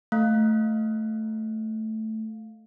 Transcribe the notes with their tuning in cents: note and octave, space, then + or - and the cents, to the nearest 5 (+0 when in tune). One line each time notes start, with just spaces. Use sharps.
A3 +0 F5 +5